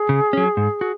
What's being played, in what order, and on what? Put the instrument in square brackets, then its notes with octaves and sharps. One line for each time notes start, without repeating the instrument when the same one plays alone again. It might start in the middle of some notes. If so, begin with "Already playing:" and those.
Already playing: [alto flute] G#4
[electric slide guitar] C#3
F#3 C#4
G#2
F#4